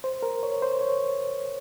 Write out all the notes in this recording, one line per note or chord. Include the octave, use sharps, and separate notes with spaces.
C5
A#4
C#5
C5
C#5